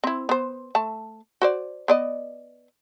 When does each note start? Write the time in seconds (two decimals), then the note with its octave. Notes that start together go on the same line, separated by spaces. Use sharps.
0.04 C4 E4
0.29 B3 C5
0.75 A3 A5
1.42 F#4 C5 D5
1.88 B3 D5 D#5